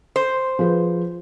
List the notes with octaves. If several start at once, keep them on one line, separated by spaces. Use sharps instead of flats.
C5
F3 G#4 B4